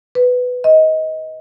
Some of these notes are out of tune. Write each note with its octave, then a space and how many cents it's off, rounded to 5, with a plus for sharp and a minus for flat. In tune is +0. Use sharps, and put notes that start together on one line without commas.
B4 +10
D#5 +20